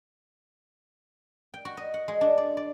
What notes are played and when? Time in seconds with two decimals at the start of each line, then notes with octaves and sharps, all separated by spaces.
1.54 G5
1.65 F#4
1.77 D#5
1.94 F#5
2.08 G#3
2.21 D4
2.38 D5
2.57 D5